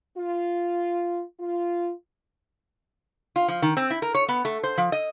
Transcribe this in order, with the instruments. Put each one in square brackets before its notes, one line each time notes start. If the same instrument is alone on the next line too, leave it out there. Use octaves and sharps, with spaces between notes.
[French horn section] F4
F4
[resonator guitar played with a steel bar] F4
F3
D#3
C4
E4
A#4
C#5
B3
A3
C5
F3
D#5